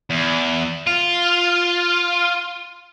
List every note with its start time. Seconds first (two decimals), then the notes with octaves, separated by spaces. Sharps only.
0.10 E2
0.87 F4